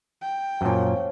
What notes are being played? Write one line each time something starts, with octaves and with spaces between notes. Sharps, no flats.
G5
F#2 A#2 F3 C#4